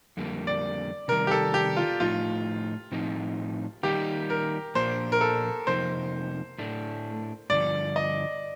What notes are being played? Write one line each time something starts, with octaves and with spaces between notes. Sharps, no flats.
F2 D3 G3 A#3
D5
C3 D#3 G3 A#4
G4
A4
G4
F4
A2 F3 A3 D#4 F4
A2 F3 C4 D#4
D#3 G3 A#3 D#4 G4
A#4
A#2 F3 A#3 D4 C5
A#4
A4
F2 C3 F3 A#3 D#4 C5
A2 A3 D4
G2 D3 F3 D5
D#5